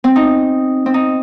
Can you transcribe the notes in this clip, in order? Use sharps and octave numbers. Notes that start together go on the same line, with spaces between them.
C4
D#4
C4
D#4